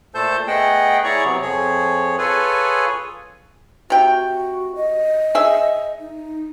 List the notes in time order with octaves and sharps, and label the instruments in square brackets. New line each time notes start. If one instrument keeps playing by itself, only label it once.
[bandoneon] A#2 A3 A4 C5 A5 G6
A3 B3 G#4 D#5 F#5 G5
E4 G#4 C#5 D5 A#5 C#6
C3 F#3 B3
F2 F3 G#4 C#5
F4 G#4 A4 B4 C#5 G#5
[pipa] C3 G5 [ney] F#4
[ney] D#5
[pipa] G#4 E5
[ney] D#4